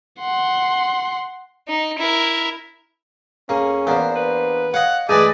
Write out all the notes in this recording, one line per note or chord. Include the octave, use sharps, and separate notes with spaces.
F#5 C6
D#4
E4 A#4
F2 A#3 C#4 G#4
E2 A#3 B3 D4 C5
B4
C#5 D#5 F5 F#5
F#2 E3 G#3 A3 G#4 B4 D5 D#5